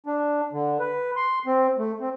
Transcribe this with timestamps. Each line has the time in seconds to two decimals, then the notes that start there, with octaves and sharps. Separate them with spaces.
0.06 D4
0.53 D3
0.80 B4
1.16 C6
1.46 C4
1.78 A3
2.00 C4